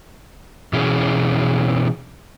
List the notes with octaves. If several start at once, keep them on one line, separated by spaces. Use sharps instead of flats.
B2 E3 C#4 G#4